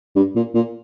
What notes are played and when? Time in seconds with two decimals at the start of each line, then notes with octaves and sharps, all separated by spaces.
0.16 G2
0.35 A#2
0.55 A#2